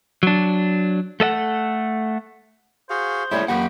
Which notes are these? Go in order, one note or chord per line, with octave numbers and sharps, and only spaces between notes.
F#3 D4
A3 A4 D#5 F#5
F#4 G#4 C5 F5
G3 A3 C#4 E4 G#4 C#5
F#2 A#3 G4 F#5 B5